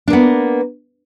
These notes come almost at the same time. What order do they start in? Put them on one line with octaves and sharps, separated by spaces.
D4 A#3 B3